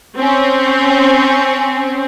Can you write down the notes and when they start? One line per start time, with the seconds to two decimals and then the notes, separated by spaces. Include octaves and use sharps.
0.16 C4 C#4